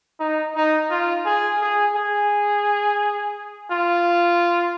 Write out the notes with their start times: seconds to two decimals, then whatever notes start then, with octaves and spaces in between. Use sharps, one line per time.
0.20 D#4
0.56 D#4
0.90 F4
1.26 G#4
1.61 G#4
1.95 G#4
3.71 F4